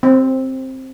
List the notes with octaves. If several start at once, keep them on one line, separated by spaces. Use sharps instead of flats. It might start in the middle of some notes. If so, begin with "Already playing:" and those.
C4